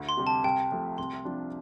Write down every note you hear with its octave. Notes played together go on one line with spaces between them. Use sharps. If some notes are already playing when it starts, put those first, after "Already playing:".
Already playing: D2
C6
C3 G3
A5
C2 G5
C3 F3 A3
C2 C6
C3 F3 D4 F4